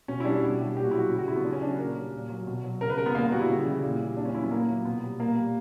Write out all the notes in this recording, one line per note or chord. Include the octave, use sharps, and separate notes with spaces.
B2 C#4
E4
G3 D4
B2
G3
A#2 G4
F#4
F#3 E4
F#4
C#3 G4
F#4
F#3 E4
B3
C#3 D4
C#4
F#3 D4
F#4
A#2 A#4
G3
A#2
F#3
B2
F#3
C#3 A#4
B4
G3 A#4
B3
A#2 A#3
B3
G3 F#4
E4
C#3
E3 G3
A#2
G3
A#2 D4
C#4
F#3 E4
B3
A#2 A#3
F#3
B2 B3
G3
A#2 A#3
G3